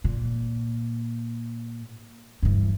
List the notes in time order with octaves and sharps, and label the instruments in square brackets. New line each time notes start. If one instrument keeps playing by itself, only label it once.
[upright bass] A#2
G2 E3